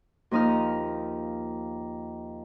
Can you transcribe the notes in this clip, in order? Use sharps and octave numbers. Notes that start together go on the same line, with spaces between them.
D#2 F3 D#4 D#6 F6